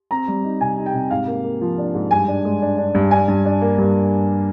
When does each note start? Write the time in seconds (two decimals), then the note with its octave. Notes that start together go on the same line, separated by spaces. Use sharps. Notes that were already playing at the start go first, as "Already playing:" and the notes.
0.11 C4 A#5
0.28 G3
0.44 D#4
0.61 C3 G#5
0.77 D#4
0.86 G5
0.94 C3
1.11 G#2 F5
1.27 A#3
1.44 A#3
1.61 F3
1.78 D4
1.94 G#2
2.11 G2 G#5
2.28 D4
2.45 G#3
2.62 D4
2.78 D4
2.95 G2
3.11 D4 G#5
3.28 G2
3.45 D4
3.62 A#3
3.78 G2